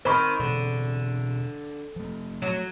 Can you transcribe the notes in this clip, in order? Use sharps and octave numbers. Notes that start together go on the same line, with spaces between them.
D#3 C4 C5 B5 C#6
B2 D3 E3 C4
F3 A3
F#3